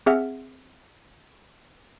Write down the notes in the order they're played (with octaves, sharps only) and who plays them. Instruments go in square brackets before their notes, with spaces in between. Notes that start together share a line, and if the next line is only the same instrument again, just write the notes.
[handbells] C4 G#4 E5 F#5 F6